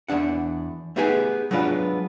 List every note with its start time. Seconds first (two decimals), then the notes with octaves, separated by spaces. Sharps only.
0.08 E2 G#2 D4 F#5
0.96 A3 B3 D#4 G4 G#4 G#5
1.51 F#3 G#3 B3 D4 F4 B4